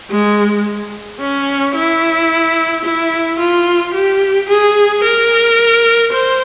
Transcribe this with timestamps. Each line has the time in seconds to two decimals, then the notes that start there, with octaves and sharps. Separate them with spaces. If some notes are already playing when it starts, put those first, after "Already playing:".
0.11 G#3
1.21 C#4
1.75 E4
2.85 E4
3.40 F4
3.94 G4
4.49 G#4
5.04 A#4
6.13 C5